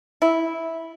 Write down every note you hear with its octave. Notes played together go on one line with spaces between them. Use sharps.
E4